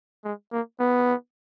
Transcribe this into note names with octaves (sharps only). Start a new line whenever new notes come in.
G#3
A#3
B3